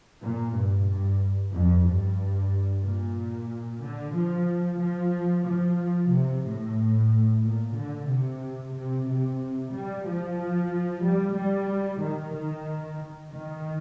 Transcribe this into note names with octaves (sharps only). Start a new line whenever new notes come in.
A#2
G2
G2
F2
G2
A#2
D3
F3
F3
F3
C3
A2
A#2
D3
C3
C3
C3
G3
F3
G3
G3
D#3
D#3
D#3